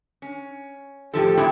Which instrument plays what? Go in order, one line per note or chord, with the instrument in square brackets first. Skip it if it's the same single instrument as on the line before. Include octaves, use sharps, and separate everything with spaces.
[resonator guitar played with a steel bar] C#4
[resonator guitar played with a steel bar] A2 F3 A4 [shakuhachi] G4
[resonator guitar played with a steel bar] F#2 A#2 E4